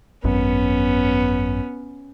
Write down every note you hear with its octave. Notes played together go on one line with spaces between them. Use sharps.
G#1 F#2 B3 C#4